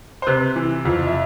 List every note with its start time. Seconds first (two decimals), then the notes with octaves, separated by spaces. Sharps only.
0.22 C5
0.27 C3 B4
0.56 E3
0.85 F2
1.07 E5